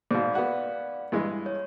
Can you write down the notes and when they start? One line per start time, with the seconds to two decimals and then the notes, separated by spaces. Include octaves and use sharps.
0.11 G#2 B2 D5 F5
0.35 B3 F#4
1.12 G2 E3 G#3
1.46 C#5